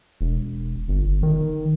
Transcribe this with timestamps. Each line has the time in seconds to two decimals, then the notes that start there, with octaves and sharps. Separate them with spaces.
0.21 E1
0.88 G1
1.23 D#3